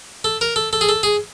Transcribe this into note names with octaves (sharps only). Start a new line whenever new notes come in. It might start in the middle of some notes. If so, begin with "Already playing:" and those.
A4
A#4
A4
A4
G#4
A4
G#4